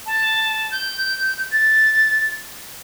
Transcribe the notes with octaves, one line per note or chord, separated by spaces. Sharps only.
A5
G6
A6